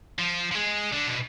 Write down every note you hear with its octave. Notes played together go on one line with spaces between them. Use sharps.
F3
F3
G#3
D3
B2